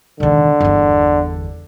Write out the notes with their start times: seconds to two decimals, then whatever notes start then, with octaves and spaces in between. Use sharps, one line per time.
0.20 E1 D3 D#3
0.60 G1 E2